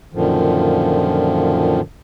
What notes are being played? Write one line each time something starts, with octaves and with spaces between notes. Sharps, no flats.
F#2 A#2 D3 D#3 F3